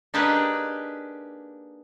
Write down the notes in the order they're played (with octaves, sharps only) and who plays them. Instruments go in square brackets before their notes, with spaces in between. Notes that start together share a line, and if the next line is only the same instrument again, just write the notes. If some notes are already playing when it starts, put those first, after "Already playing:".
[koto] A#3 D4 D#4 G4 G#4 B4